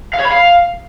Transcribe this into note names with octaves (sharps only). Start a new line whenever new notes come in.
F5
C#5
B5
F5